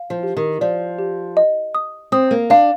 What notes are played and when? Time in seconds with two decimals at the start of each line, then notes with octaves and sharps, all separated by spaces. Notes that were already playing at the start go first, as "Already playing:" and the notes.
Already playing: F5
0.10 F3
0.23 G4
0.37 D#3
0.61 F3 D5
0.99 G4
1.37 D#5
1.75 D#6
2.12 C4 D#6
2.31 A#3
2.50 D4 F5